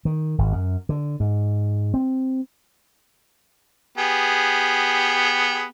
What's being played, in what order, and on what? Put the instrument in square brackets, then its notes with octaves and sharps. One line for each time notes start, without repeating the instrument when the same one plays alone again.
[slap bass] D#3
G#1
F#2
D3
G#2
C4
[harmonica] B3 G4 G#4